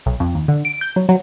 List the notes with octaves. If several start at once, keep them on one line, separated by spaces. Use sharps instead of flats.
B1
F2
D#2
D3
D7
G6
F#3
F#3